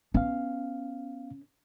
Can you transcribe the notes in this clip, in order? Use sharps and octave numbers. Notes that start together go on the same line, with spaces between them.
B3 C#4 F5